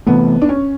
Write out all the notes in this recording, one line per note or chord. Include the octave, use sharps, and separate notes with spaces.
C3 E3 A3 B3
D4
C#4